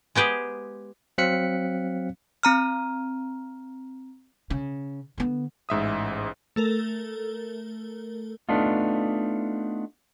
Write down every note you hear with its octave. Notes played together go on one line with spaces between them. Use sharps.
G#3 B3 G4 G#4 C5
F#3 C4 F5 F#6 B6 C#7
C4 A#5 F6
C#3
D3 B3
A1 G#2 E5 D#6
A3 A4 A#4
A3 B3 D4 D#4 F4